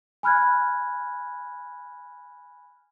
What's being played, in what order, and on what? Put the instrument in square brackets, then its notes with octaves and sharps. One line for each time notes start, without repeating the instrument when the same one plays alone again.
[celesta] G#5 B5 F6 F#6 G#6